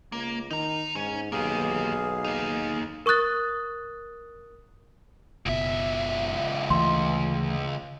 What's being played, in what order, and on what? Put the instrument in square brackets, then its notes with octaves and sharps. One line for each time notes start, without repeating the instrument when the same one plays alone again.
[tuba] C#2 [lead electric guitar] A#3
[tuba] D#3 [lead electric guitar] D#4 A#5
[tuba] G#2 [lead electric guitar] C#4
[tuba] B1 [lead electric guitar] A#3 G4 [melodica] G#4 F5
[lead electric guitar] A#3 D#4
[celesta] A#4 C#6 D#6 F#6 A6
[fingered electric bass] F#1 B2 [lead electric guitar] C#2 E5
[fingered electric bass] D2 E3 A3 [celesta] C6